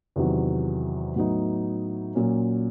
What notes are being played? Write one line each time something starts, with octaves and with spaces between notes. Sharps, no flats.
E2 C3 D#3 F#3
A2 F#3 B3 D#4
A#2 F#3 A#3 C#4